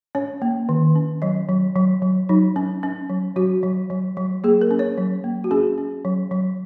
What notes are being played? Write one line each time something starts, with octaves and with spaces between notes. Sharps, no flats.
C#4 C#5
A#3
D#3
C#4
F#3 D#5
F#3
F#3
F#3
F#3 D#4
C#4
C#4
F#3
F#3 F#4
F#3
F#3
F#3
A#3 G#4
A#4
C#4
C#5
F#3
A#3
F#4
C#4 G#4
C#4
F#3
F#3